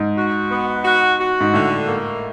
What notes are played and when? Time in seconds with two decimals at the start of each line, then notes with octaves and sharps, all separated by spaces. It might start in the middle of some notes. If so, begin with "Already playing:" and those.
Already playing: G#2
0.17 F#4
0.51 B3
0.85 F#4
1.19 F#4
1.41 G#2
1.52 A2 D3
1.87 A#3